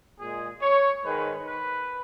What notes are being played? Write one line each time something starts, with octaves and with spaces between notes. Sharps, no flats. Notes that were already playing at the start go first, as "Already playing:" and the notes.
A#2 G#3 G#4
C#5
G#2 D#3 G#3 B4
B4